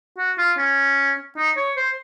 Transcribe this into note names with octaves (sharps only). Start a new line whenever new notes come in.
F#4
F4
C#4
D#4
C#5
C5